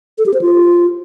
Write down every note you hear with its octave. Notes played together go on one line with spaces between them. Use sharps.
A4
G4
C5
F4